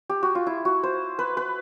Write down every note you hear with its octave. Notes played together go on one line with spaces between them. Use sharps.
G4
F#4
F4
E4
F#4
C5
B4
B4